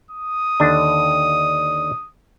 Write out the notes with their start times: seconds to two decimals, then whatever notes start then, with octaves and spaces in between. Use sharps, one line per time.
0.11 D#6
0.60 D#2 D3 D4